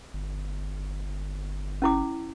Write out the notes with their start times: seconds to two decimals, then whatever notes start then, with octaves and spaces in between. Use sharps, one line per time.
0.13 G1
1.82 C#4 E4 D6